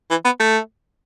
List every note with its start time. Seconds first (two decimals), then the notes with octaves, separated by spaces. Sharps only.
0.11 E3
0.25 B3
0.40 A3